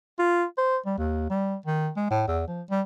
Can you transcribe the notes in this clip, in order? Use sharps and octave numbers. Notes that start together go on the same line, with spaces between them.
F4
C5
G3
D#2
G3
D#3
G#3
A2
E2
F3
G3